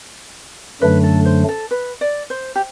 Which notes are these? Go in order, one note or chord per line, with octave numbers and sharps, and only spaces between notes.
F#2 D3 F#3 A3 D4 B4
A4
C5
A4
B4
D5
C5
G4